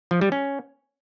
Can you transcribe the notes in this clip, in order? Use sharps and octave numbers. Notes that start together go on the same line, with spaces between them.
F3
G3
C#4